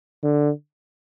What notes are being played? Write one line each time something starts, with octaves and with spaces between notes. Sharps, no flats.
D3